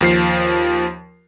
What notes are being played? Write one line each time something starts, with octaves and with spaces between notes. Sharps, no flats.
D#2 F3 C7